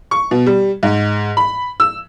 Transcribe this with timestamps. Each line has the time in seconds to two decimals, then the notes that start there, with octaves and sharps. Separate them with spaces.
0.11 C#6
0.31 B2
0.46 G3
0.83 G#2
1.37 B5
1.80 E6